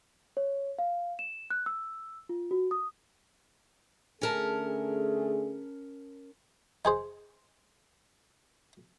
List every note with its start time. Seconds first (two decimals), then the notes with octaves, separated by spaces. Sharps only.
0.37 C#5
0.79 F5
1.19 E7
1.51 F#6
1.66 E6
2.29 F4
2.51 F#4
2.71 D#6
4.21 D3 A3 C#4 G#4 A#4 A5
6.85 D#4 G#4 C5